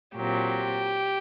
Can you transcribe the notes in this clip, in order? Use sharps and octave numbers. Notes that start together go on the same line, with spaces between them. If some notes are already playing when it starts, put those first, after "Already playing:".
A#2 F#3 C4 G4